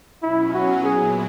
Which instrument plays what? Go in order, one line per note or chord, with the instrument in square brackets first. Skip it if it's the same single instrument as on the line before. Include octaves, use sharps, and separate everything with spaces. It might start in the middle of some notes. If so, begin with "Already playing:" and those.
[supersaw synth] B2 F#3 C#4 [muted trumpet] E4
[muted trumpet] F#4
[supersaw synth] A#2 F#3 B3 E4 [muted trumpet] G#4